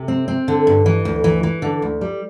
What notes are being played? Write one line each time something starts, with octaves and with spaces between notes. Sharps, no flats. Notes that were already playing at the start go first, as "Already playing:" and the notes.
Already playing: C3
C4
C4
D3
G2
E3
D2
E3
E3
D3
D2
G3